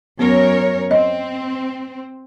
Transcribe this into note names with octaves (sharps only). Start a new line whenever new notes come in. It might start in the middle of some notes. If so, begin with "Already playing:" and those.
F#2 B3 A#4 C#5
C4 D#5